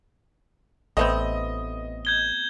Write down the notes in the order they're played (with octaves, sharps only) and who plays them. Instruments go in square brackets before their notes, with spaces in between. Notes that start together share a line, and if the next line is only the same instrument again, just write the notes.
[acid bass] A1 [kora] A3 B3 C4 [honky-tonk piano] D#5
[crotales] G6 G#6 G7